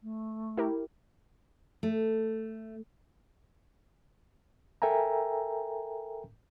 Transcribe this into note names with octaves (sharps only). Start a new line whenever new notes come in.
A3
E4 G4 A#4
A3
A4 A#4 E5 G5 G#5 A#5